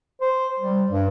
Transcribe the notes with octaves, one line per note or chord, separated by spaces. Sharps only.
C5
G3
G2